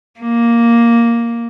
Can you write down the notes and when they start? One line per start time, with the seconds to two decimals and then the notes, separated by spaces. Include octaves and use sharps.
0.20 A#3